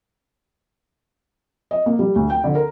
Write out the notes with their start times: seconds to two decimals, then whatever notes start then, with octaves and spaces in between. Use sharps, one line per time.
1.71 D#5
1.86 A#3
1.99 G3
2.16 D2
2.30 G5
2.44 D3
2.55 A#4